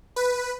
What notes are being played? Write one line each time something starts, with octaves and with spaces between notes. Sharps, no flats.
B4